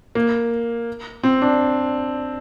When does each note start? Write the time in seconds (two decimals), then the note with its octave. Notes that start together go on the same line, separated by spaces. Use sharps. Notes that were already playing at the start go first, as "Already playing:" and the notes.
0.15 A#3
1.23 C4
1.42 D4